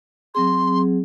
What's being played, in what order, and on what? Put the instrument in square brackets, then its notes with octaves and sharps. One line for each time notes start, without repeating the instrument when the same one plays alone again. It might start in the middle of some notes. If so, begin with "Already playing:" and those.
[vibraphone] F#3 C4 G#4 [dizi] C6